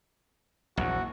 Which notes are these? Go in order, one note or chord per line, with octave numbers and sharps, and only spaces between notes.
A#1 E2 F#4